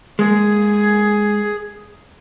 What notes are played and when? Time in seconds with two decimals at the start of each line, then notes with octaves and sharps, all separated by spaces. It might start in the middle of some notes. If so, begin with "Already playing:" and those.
0.19 G#3 A#3 G#4